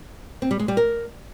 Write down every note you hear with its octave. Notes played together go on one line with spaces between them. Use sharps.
C4
G3
G#3
G3
A#4